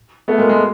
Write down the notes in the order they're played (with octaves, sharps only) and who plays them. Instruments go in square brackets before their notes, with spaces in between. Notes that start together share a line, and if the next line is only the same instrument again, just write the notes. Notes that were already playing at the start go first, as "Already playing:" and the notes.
[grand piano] A3 B3
G#3 A#3
G#3